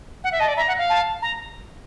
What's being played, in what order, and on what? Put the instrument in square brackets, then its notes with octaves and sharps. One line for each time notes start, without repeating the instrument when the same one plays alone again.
[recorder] F#5
E5
[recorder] D#5 [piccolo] A5
[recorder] D5
[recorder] E5 [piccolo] A#5
[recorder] F#5
F5
[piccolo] A5
A#5